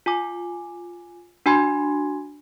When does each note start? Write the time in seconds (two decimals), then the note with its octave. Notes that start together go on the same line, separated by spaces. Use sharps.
0.06 F4 G#5 D6
1.46 D4 F#4 G#5 B5 C6 G#6